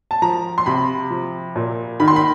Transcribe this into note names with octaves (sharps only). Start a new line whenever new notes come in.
A5
F3 A#5
C6
C3 B5
F3
A#2
D#3 B5
C6
B5